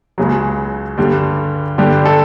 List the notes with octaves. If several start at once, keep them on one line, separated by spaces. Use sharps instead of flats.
C#2 C#3 F#3
G2 D3 G3
G2 D3 G3 G4
A4